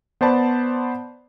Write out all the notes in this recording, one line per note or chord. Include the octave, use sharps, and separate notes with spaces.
B3 C5 D5 A5 B5